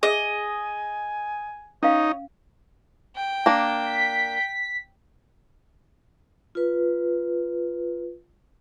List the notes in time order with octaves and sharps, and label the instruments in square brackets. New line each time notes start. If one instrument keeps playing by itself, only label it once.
[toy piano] G#4 [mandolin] D#5 [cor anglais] G#5
[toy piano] C#4 F5 [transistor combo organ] D#4 [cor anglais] C#5
[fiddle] G5
[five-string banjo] A#3 D4
[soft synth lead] B6
[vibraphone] F4 B4